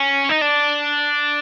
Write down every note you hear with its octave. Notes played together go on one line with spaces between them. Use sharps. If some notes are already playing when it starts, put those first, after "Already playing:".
Already playing: C#4
D#4
D4